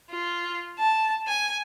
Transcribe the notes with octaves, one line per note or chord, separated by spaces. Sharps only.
F4
A5
G#5